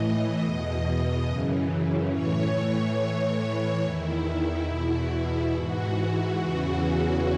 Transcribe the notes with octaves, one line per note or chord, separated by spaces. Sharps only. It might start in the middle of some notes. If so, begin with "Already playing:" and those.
Already playing: A2 E3 D#5
E2 B2
F#2 C#3 E3
A2 E3 C#5
A2 E3
E2 D#3 E4
E2 B2 E4
G#2 E3 F#4
E2 C#3 E3 F#4